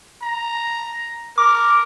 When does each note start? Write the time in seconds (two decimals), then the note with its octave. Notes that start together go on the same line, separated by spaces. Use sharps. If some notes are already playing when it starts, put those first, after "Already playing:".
0.23 A#5
1.38 A#4 D6